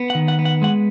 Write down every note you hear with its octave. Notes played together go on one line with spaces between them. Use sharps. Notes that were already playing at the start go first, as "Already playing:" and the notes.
Already playing: B3
F#5
D#3
F#5
B3
F#5
G#3 F#5